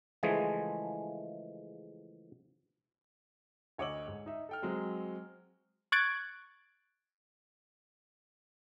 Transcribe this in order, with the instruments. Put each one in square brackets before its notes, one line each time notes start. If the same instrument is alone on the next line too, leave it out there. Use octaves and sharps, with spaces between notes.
[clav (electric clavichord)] C#3 E3 F3 G#3 A3 G#4
[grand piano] D2 C#5 D#5 D6 E6 F#7
G#2
D#4 E5
A4 G5 F6
F#3 G#3 C4
[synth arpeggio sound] C#6 F#6 G#6 A6 D7